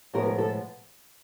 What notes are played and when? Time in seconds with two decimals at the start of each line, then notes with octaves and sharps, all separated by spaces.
0.14 A2 F3 G#3 B3 A#4
0.26 A#4
0.38 A4